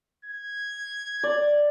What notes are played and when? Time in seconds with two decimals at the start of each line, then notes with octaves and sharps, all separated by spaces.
0.25 G#6
1.23 D5